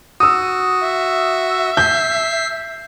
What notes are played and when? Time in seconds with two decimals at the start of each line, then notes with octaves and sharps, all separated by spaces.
0.20 F#4 D#6 E6
0.83 E5
1.77 G6 B6 C7